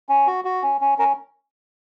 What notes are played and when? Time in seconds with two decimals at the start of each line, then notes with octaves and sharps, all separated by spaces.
0.09 C#4
0.27 F#4
0.45 F#4
0.63 C#4
0.81 C#4
0.98 C#4 A#4